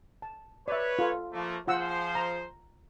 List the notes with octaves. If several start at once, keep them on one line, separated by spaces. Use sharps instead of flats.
A5
B4 C#5 D5 E5
F4 A4
F3 A3 A#3
F3 F4 G#4 C5 F#5 E6
A#5